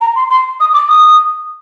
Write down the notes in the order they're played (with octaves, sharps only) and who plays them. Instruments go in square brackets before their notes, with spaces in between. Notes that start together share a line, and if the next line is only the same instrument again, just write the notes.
[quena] A#5
C6
C6
D#6
D6
D#6